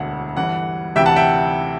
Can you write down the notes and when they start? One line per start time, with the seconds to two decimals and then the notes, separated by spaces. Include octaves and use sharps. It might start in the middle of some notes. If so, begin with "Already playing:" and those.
Already playing: E1 D2 D3 F#5
0.36 G1 G2 E3 F#5
0.95 D2 C3 E3 E5 G5
1.06 F#5 A5
1.16 E5 G5